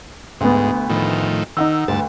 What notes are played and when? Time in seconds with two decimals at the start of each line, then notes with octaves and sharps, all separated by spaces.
0.41 D2 G#2 B3
0.90 A2 D#3 F3
1.57 D#3 D#4 F#5 E6
1.88 D2 G2 B4 A5